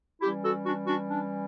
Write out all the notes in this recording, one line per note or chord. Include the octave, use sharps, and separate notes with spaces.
E3 G3 C#4 E4 G4
F#4 A4
D4 F#4
D4 F#4
D4